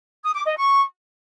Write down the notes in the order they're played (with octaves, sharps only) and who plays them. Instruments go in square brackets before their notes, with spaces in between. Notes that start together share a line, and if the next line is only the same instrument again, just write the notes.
[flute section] D#6
D6
D#5
C#6